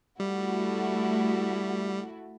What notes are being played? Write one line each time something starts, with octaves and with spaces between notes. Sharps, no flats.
G3 A3 E4 F#4